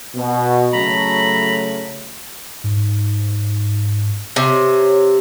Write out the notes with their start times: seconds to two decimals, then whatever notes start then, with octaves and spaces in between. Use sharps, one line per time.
0.15 B2
0.73 C#3 F#3 A3 A#5 B5
2.64 G#2
4.36 C3 C#5